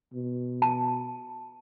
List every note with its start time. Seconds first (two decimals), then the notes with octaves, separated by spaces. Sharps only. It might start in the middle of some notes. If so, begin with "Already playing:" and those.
0.13 B2
0.62 A5